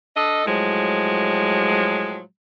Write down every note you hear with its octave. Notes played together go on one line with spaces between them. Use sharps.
D4 A4 D#5
A2 F3 F#3 G#3